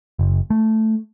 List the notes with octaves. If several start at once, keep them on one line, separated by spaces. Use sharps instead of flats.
F#1
A3